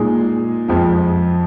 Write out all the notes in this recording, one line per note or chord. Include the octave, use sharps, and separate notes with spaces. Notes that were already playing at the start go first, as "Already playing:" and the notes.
Already playing: A#2 G#3 D#4 G#4
F2 F3 G#3